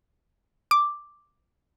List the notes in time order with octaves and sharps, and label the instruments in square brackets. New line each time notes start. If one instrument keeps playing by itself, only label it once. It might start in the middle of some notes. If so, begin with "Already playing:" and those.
[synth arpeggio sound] D6